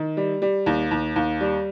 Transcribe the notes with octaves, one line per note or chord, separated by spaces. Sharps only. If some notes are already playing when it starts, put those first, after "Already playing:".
Already playing: D#3
G3
G3
D#2
D#2
D#2
G3